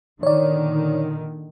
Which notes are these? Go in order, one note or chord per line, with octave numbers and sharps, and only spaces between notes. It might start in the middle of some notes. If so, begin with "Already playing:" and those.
A#2 D3 D#3 C#5 D5